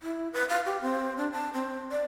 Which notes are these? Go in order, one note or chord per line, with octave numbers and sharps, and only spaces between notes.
E4
B4
F5
G4
C4
D4
A5
C4
D5